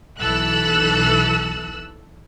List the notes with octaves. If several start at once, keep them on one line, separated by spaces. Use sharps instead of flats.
B1 E3 A4 E6 F#6